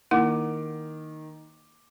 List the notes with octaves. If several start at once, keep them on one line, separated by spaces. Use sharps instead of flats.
D#3 A#3 E4 F#5 D6